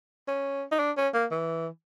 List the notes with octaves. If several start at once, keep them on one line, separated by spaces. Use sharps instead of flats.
C#4
D#4
D4
C#4
A#3
E3